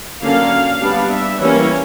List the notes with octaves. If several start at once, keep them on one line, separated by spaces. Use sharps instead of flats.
D3 F#3 A#3 C#4 F5
G3 B3 D4
E5
E3 G3 A#3 C#4 C#5